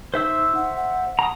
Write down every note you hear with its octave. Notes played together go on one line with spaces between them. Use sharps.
D#4 C5 E5 E6
F#5
F#5
A#5 D#6